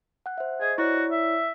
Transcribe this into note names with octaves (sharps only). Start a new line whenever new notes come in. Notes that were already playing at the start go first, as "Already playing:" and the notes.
F#5 F#6
C5 E5
G#4 C5 D#5
E4 F#4 C#5 D5
E5